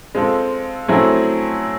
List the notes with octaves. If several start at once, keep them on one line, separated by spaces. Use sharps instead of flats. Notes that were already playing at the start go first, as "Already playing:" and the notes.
G#3 C4 F4 A4
F#3 A3 C4 E4 G#4